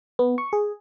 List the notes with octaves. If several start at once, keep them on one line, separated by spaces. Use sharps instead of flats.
B3
C#6
G#4